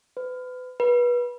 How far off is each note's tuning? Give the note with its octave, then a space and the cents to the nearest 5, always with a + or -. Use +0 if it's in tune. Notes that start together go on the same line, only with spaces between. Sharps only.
B4 +35
B4 -25